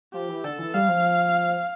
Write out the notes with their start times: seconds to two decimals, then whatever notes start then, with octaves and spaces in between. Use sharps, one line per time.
0.13 F3 G4
0.28 E3
0.44 D3 A4
0.59 E3
0.74 G3 F5
0.88 F3